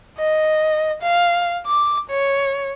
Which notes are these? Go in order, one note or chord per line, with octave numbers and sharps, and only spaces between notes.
D#5
F5
D6
C#5